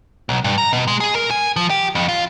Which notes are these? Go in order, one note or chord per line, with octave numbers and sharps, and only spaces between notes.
B1
G2
A#5
B2
G#3
G#4
A#4
G#5
F3
G4
F2
F4